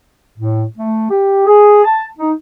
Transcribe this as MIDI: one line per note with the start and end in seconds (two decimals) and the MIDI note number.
0.37 0.64 45
0.78 1.06 57
1.10 1.43 67
1.46 1.84 68
1.85 2.06 81
2.19 2.31 63